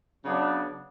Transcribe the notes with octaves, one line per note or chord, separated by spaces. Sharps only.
C#3 F#3 B3 D4